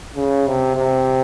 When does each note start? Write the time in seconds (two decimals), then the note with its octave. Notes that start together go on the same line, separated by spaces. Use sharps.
0.16 C#3
0.47 C3
0.76 C3